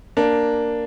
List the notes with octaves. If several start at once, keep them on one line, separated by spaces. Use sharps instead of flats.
A#3 D4